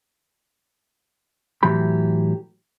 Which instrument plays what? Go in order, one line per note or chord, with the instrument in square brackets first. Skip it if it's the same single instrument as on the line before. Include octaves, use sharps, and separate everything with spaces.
[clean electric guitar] A2 E3 F#3 G4 B5